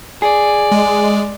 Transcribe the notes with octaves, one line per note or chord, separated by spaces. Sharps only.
G#4 D5
G#3